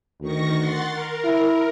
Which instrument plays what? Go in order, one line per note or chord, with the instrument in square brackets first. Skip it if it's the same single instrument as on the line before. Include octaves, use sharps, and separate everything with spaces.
[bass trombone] D2 [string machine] D#3 C#6 A#6
[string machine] F#5 C6 A6
A#4
[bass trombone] E4